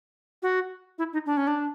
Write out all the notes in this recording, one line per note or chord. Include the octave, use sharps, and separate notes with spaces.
F#4
E4
D#4
D4
C#4
D4